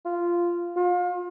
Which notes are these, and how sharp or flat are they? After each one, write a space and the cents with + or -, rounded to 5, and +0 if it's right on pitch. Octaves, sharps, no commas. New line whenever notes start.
F4 -10
F4 +35